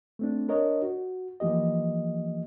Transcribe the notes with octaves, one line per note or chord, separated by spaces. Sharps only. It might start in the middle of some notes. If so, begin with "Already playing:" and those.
A3 C4 D4
D4 A#4 C#5 D#5
F#4
E3 F3 A#3 G4 D#5